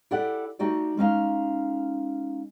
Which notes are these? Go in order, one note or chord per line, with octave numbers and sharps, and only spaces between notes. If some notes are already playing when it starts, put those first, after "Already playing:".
E4 G4 A4 D5 F#5
A3 D#4 F#4 G4 D5
G#3 C#4 D#4 F5